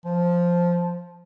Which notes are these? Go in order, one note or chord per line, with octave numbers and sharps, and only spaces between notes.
F3